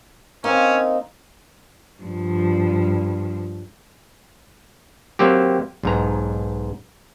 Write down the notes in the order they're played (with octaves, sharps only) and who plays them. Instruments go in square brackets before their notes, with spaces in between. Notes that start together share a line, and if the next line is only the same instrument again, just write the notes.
[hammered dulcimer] A#3 C4 [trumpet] C#4 [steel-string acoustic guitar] D#4
[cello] G2 F3
[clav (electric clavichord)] F#3 A#3 C4 G4
B1 G#2 A#5